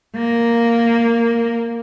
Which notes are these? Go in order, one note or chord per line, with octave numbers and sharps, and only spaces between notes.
A#3